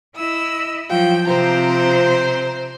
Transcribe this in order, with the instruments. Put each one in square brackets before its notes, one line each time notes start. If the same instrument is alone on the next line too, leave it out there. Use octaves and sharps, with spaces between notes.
[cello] E4 D#5 [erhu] E6
[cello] F3 F#3 [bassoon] F4 [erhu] G5
[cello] C3 C4 [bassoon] F3 [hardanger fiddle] C5 [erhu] A#5